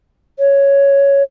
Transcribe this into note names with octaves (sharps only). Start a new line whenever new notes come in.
C#5